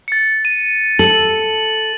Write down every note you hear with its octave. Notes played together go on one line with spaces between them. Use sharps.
A6 C#7
D#7
A4 F#7